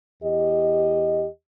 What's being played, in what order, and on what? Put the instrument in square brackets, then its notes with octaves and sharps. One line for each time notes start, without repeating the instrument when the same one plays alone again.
[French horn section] E2 G4 D#5